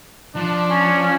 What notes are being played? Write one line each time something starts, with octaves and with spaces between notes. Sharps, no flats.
F3 D4
C#4